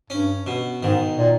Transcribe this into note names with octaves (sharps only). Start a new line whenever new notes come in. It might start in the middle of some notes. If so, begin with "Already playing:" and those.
G2 C#4
B2
G#2 D#3
A#2